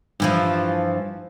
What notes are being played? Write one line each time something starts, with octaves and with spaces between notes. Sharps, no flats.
G2 E3 F3